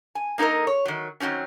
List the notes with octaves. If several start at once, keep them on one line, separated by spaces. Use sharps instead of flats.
G#5
A#3 D#4 A4 A#4 D#5
C#5
D#3 F#3
D#3 E3 F#3 C4 C#4